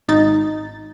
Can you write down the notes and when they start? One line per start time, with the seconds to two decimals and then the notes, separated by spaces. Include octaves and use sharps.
0.08 G#1 D#4 A6